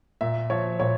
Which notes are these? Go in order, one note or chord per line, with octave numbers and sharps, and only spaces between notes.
A#2 E5
F3 C#5
A#2 C#5